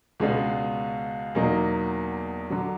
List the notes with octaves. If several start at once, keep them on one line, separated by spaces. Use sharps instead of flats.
C#2 B2 G#3 B3 D4
E2 B2 F#3 A#3 D#4
D3 F#3